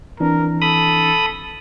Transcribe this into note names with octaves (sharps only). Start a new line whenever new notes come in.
E3 C4 D4 A#4
A4 B5 D#6